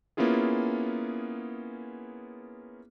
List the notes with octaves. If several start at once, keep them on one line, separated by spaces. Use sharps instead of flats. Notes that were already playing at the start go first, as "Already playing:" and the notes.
A#3 B3 C#4 E4 F4 G#4